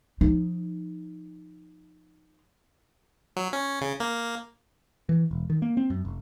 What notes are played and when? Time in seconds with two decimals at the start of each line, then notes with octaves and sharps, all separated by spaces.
0.21 F3 D#4
3.37 F#3
3.53 C#4
3.81 C#3
4.00 A#3
5.09 E3
5.31 E1
5.50 D#3
5.62 A#3
5.77 C4
5.90 F#2
6.05 F1